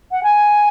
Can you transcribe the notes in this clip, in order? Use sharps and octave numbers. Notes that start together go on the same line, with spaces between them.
F#5
G#5